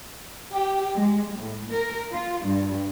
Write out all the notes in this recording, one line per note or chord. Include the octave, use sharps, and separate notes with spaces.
G4
G#3
A2
A#4
F4
G2